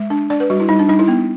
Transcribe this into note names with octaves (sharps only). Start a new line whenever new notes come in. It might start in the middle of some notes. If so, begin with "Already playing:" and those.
Already playing: G#3 E5
D4
D4 D5
B4
G3 F#4
E4
G3 D#4
D4
G3 D#4
E4
B3